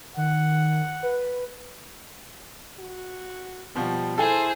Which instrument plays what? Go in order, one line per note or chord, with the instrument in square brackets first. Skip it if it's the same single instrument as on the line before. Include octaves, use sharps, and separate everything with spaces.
[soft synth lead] D#3 [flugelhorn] F#5
[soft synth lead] B4
[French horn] F#4
[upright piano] B2 F3 [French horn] G3
[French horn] E4 [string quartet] G#4 C5 [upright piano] A4 G#5